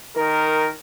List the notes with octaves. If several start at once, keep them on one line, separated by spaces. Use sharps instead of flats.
D#3 A#4